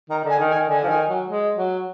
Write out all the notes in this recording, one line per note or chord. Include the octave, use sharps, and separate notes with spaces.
D#3 A#5
D3 G#5
D#3
G#5
D#3
D3 G#5
F3
D#3
F#3
G#3
F#3